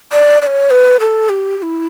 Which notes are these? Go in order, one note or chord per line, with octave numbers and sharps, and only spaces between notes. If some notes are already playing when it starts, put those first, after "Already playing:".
D5
D5
C#5
B4
A4
G4
G4
E4